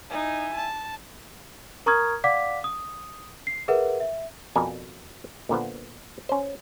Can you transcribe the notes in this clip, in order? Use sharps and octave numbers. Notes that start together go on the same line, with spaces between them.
D#4 E4 E5 G#5
A5
A#4 A#5 C#6 D#6 F6 G#6
D5 F5 F#5 D6 B6
D#6
C7
G#4 A#4 B4 E5 F#5
E5
F2 B2 A#4 D5 G#5
A#2 D3 F3 B3
C#4 C5